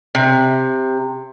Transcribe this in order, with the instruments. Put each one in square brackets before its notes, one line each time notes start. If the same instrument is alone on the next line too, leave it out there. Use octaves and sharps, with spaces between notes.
[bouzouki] C3